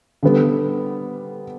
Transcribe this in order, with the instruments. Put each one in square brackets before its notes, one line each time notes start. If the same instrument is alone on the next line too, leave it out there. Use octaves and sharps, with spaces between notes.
[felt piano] D3 G3 B3